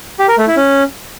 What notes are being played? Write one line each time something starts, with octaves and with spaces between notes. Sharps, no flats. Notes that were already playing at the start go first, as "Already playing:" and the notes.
G4
A#4
A3
E4
C#4